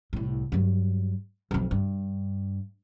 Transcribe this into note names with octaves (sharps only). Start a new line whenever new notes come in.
C2 A2
G2 F#3
B1 F2
G2